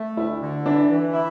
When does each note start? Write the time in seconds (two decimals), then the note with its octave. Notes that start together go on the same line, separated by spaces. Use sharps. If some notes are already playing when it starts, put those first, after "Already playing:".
Already playing: A3
0.17 D2 E4
0.42 D3
0.66 E3 D4
0.90 E3
1.14 E4